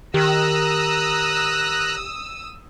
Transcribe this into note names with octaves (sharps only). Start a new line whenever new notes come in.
D#3 G4 A#5 D#6 E6 F#6